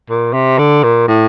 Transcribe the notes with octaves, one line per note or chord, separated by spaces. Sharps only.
A#2
C3
D3
A#2
A2